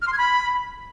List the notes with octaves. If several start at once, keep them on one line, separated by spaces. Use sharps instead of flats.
F6
C6
G#6
B5